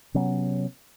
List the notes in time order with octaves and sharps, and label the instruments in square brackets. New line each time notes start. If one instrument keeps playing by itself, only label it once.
[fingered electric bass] C3 F#3 B3 C#4